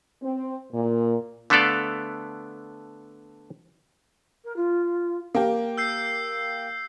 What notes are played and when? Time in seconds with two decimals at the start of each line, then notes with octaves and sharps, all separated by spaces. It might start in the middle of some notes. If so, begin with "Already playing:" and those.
0.22 C4
0.72 A#2
1.50 D3 A3 B3 A4 D5 F5
4.45 A#4
4.56 F4
5.35 A#3 G4
5.78 E6 G6 C7